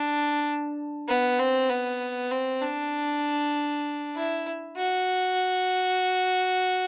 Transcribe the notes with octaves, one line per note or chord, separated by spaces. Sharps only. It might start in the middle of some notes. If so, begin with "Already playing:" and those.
Already playing: D4
B3
C4
B3
C4
D4
E4
F#4